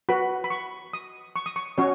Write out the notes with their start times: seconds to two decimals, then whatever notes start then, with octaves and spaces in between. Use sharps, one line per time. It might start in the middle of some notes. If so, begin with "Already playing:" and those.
0.09 F#4 B4 B5
0.44 B5
0.50 C#6
0.93 D#6
1.36 C#6
1.46 D#6
1.56 C#6
1.78 C#4 F#4 C#5